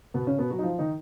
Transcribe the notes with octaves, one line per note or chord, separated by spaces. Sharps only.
B2 B3
C#3 C#4
B2 B3
F#3 F#4
D#4
F3 F4
D#3 D#4